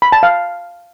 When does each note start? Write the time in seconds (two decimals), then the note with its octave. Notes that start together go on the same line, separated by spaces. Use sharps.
0.02 B5
0.12 A5
0.23 F5